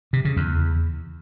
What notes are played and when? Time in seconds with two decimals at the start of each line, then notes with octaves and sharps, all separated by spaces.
0.13 C3
0.25 C#3
0.37 E2